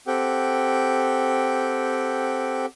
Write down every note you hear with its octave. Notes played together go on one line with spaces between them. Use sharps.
C4 G4 A4 F#5 G5